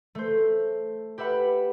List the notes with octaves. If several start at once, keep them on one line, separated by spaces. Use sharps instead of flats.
A3 C5
G4 B4 E5 F#5 B5